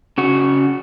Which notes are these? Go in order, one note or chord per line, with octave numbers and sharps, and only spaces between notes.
C#3 F#4